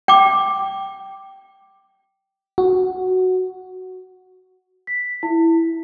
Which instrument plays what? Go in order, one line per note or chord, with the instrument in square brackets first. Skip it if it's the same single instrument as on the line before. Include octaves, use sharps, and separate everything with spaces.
[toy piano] G5 D6
[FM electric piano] F#4
[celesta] B6
E4